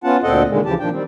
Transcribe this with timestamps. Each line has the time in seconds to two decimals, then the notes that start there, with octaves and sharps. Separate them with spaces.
0.04 B3 C#4 F4 F#5 A5
0.24 D2 A#2 C4 A4 D#5 F#5
0.49 A#2 D3 D#3 G#3
0.65 D2 C#3 E3 F3 G4 A5
0.80 A#2 D#3 F3 D4 G5
0.92 D#3 G3 C4